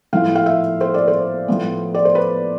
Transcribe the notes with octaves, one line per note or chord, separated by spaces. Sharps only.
A2 F3 B3 E4 F5
F5
E5
C5
D5
C5
A2 F3 B3
D5
C5
B4